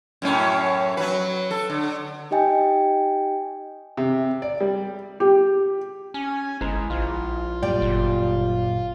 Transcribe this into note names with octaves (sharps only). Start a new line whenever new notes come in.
F#2 A2 C#4
F#3 B4
A4
D3
D#4 G4 D#5 G5 G#5
C3
D5
G3
G4
C#4 G#5
G1 G#3 E4 C5 A#5
A#1 F4
F#2 A#2 G3 D5 G5
G1